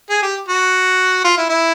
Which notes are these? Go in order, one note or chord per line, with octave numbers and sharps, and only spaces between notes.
G#4
G4
F#4
F4
E4
E4